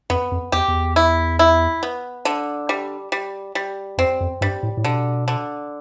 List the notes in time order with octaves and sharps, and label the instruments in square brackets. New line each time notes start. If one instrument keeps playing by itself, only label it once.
[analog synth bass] F2 [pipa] B3
[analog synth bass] F2
[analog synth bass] E2 [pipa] G4
[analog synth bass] E2
[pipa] E4
E4
B3
D3
G3
G3
G3
[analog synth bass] F2 [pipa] C4
[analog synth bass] F2
[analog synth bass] G2 [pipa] G3
[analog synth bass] A2
A2
[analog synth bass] B2 [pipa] D3
[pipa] D3